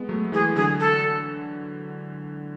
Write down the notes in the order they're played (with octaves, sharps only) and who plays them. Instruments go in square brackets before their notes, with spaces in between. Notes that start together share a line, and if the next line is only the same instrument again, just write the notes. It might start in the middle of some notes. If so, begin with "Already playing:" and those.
Already playing: [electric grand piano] G#3 B3
F#3 A3
A3
[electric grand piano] E3 G#3 [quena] G#4
[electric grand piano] D3 F#3 [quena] G#4
[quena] A4